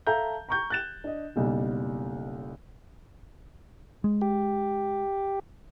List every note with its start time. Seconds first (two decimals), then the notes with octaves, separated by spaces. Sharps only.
0.07 A4 E5 F5 A5 A#5 G6
0.49 A#5 C#6 G6
0.70 F#6 A6 E7
1.04 D4 D#5
1.36 F#1 B1 G3 D#5
4.04 G#3
4.21 G4